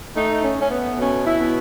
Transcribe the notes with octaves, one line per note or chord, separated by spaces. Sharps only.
A3 D#4
C#4
A3 C#4
B3
B2 C#4
E4
B2